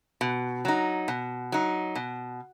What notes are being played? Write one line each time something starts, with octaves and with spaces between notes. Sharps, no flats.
B2
F#3 D#4
B2
F#3 D#4
B2